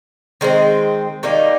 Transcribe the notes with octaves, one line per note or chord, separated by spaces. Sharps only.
D#3 G#3 C4
D#3 G3 A#3 D#4